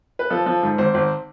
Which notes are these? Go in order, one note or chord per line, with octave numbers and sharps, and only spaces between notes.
B4
F3 A4
F3
G#2
G#1 C5
G#1